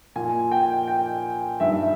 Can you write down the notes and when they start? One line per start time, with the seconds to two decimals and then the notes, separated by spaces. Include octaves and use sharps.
0.16 A#2 G#5
0.52 G5
0.88 G5
1.60 G2 D#3 E5